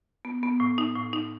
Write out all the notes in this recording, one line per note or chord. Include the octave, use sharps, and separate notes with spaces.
B3
B3
A2
D#4
A2
D#4